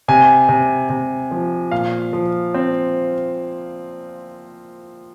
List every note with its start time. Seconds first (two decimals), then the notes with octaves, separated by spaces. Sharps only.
0.08 C3 G#5
0.49 C3
0.90 C3
1.31 F3
1.71 A#2 F5
2.13 F3
2.54 C4